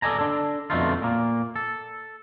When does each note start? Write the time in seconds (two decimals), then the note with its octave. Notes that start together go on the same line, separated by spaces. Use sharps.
0.02 A4 D5 D#5 G#5 A#5
0.19 D4 A4
0.70 F2 B2 D3 A3 D#4 F4
1.02 A#2 A#3
1.56 A4